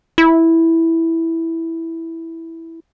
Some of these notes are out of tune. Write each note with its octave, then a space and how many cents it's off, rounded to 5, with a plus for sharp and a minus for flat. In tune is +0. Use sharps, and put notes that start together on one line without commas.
E4 -5